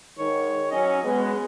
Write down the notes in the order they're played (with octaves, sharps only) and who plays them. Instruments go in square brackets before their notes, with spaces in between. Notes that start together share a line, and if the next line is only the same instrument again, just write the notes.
[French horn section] G#2 D#3 [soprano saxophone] C#5
[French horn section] F#3 C#4 [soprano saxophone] D#5
[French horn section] G#3 B3